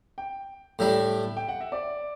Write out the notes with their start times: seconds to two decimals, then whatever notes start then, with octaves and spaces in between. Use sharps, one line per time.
0.18 G5
0.79 A2 G3 D4 E5
1.37 G5
1.48 F#5
1.61 E5
1.72 D5